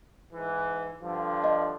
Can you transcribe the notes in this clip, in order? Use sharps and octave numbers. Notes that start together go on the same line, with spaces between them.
G#2 E3
G2 D3 F3
D#5